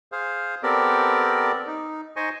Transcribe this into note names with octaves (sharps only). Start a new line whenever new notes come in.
G#4 C5 F5
B3 C4 G4 A4 A#4 D5
D#4
D#4 C5 D#5 G#5 C#6